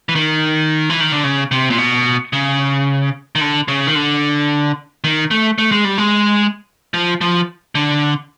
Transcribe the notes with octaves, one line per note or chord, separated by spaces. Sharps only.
E3
D#3
E3
D#3
D3
C#3
C3
A#2
B2
C#3
D#3
D3
C#3
D#3
D3
D#3
A3
A3
G#3
G3
G#3
F3
F3
D3